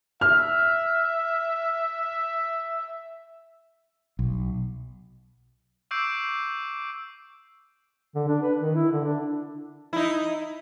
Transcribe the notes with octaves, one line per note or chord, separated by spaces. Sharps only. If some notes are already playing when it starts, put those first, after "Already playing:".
E5 F6
B1
C#6 D6 E6 G6 C7 D7
D3
D4
B4
D#3
E4
D3
D4
D#4 E4